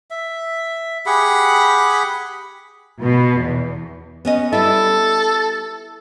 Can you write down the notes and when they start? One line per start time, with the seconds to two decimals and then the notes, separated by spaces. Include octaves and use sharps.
0.11 E5
1.06 G4 G#4 F#5 B5
3.00 B2
3.40 E2
4.25 B3 C#4 D#5
4.52 G3 E4 A4